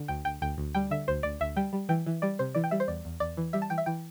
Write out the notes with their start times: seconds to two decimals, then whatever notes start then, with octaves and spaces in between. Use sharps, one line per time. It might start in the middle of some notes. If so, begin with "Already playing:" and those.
Already playing: D3
0.08 D2 G5
0.25 D2 G5
0.42 D2 G5
0.58 D2
0.74 G3 G5
0.91 D3 E5
1.08 D2 C5
1.23 D2 D5
1.40 D2 E5
1.56 G3 G5
1.73 G3
1.89 E3 G5
2.06 E3
2.22 G3 D5
2.39 C3 C5
2.55 E3 D5
2.64 G5
2.71 G3 E5
2.80 C5
2.88 E2 D5
3.05 E2
3.20 E2 D5
3.37 E3
3.53 G3 E5
3.62 A5
3.70 E3 G5
3.78 E5
3.86 E3 G5